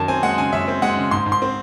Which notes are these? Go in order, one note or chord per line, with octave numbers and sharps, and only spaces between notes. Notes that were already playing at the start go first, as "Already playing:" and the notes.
Already playing: F#2 D#3 A5
C4 G#5
G#3 F#5
C#3 G#5
F#2 E5
C4
G#3 F#5
C#3
G#2 C6
G#2
C6
C4